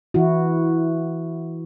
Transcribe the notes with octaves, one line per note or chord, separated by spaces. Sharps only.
E3 E4 F#4